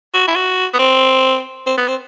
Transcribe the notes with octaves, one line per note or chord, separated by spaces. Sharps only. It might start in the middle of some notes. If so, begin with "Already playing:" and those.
F#4
E4
F#4
B3
C4
C4
B3
C4